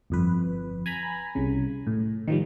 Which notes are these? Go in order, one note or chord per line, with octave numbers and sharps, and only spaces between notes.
G1 F2 B4
G#5 A#5 B5
C2 C#3
A2
D#3 F3 G3